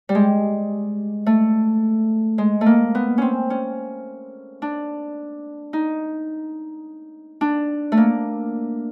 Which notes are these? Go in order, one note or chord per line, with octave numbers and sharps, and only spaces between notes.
G3
G#3
A3
G#3
A3
A#3
B3
C4 C#4
C#4
D4
D#4
D4
A3
A#3